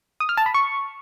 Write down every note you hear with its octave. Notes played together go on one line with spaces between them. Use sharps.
D#6
F6
A5
B5
C#6